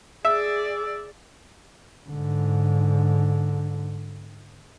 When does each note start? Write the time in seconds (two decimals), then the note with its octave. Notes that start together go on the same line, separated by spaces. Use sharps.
0.25 G#4 D5 E5
2.09 G#2 D3